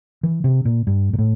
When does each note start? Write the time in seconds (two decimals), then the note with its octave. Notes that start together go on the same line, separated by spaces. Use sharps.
0.23 E3
0.44 C3
0.65 A#2
0.87 G2
1.13 A#2
1.19 A2